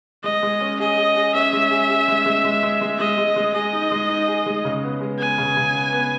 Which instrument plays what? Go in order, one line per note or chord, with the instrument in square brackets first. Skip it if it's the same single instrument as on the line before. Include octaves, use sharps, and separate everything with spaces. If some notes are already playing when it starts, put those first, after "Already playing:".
[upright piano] G#3 [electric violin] D#5
[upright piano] G#3
C#4
[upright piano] G#4 [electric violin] D#5
[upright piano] G#4
G#4
[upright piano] C#4 [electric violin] E5
[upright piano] G#3
G#4
G#4
G#3
G#3
G#3
G#3
G#3
[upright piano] G#3 [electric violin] D#5
[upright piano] G#3
G#3
[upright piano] G#4 [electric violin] D#5
[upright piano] D#4
G#3
D#4
G#4
G#3
C#3
B3
G#3
[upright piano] B3 [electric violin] G#5
[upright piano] C#3
C#3
B3
B3